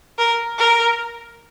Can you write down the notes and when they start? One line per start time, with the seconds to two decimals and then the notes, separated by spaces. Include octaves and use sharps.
0.18 A#4
0.59 A#4